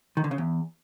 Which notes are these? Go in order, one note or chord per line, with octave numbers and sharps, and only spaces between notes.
D#3
D3
C#3
E2